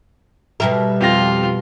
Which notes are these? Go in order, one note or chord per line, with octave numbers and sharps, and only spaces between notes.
B2 G3 A#4 E5
F2 F4 G4 A#6